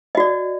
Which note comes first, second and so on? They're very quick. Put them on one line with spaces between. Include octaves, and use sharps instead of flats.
D#5 F#4 D5